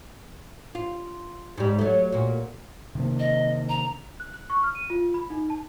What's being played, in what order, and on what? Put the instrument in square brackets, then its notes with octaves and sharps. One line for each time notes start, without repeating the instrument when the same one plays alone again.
[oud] F4
G#2 G3
F#3 A3
A#2 F#4
[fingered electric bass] C3 D#3 A#3
[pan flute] D#5
A#5
[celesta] F#6
F#6
C#6
F6
D#7
F4
B5
D#4
A5